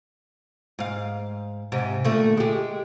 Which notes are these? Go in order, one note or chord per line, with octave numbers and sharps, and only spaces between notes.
G#2 F5
G#2 C3
A#2 D3 A3
G#3 G4